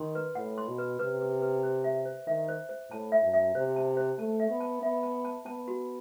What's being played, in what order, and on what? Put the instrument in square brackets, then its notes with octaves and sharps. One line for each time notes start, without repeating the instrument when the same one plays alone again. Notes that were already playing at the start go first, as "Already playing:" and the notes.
Already playing: [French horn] D#3 [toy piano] C6
[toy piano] B4
[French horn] A2 [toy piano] F#5
[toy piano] C6
[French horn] B2
[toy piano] B4
[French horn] C3 [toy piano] B4
[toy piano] B4
B4
C5
E5
C5
[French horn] D#3 [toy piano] E5
[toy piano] C5
C5
[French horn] A2 [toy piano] A5
[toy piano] E5
[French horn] F#2
[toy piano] E5
[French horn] C3 [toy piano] C5
[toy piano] A5
C5
[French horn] A3 [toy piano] A5
[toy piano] E5
[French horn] B3
[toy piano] A5
[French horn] B3 [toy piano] E5
[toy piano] A5
A5
[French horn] B3 [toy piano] A5
[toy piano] F#4